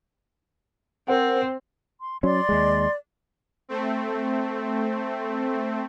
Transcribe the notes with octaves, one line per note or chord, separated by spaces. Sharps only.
C4 A#4 C5 F#5
C6
F#3 C#4 D5 C6
D#2 G#3
A3 C4